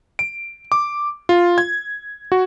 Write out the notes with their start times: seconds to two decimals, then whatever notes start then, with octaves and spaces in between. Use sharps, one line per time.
0.19 D7
0.72 D6
1.29 F4
1.58 G#6
2.32 F#4